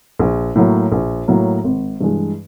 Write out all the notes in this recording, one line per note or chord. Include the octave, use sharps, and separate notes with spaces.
A#1
A2 F#3 A#3
A#1
A2 F#3 A#3
G#1
G2 E3 G#3